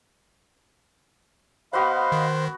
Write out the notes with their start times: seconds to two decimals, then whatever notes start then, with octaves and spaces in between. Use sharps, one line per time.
1.73 B3 F#4 C5 D#5 F5 F#5 B5
2.12 D#3